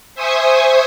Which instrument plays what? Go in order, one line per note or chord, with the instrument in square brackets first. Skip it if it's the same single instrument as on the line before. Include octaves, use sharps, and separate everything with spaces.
[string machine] C5 E5 G#5 C#6 D#6